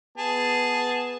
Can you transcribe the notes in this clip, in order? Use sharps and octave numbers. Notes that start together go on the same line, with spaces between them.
B3 G#4 A5